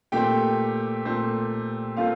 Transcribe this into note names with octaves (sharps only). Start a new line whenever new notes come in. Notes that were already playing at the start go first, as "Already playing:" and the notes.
A#2 A3 C4 G4 G5
A#2 A3 C4
A#2 A3 C4 F4 F5